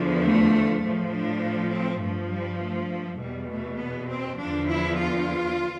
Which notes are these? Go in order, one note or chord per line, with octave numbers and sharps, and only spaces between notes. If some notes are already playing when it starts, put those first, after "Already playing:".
Already playing: E2 D3 F3
A3
A2 F3
D4
C4
G2 F3 A3
G3
A3
A3
E2 B2 G3
A3
B3
C4
E2 D3 F3 D4
E4
F4